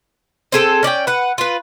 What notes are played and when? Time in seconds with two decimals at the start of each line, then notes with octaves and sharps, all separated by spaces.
0.52 C4 G#4 A4
0.83 C#4 D5 D#5 G5
1.07 B4 F#5
1.38 F4 B4